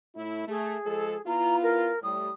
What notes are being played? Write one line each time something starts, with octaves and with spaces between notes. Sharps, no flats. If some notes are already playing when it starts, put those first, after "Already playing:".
A2 A3 E4
A3 G#4
F3 G#3 A4
B3 E4 F4 A#5
A#4
A2 G3 D#6